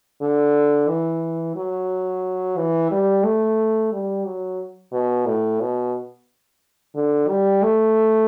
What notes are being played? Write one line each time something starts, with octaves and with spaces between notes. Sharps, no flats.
D3
E3
F#3
E3
G3
A3
G3
F#3
B2
A2
B2
D3
G3
A3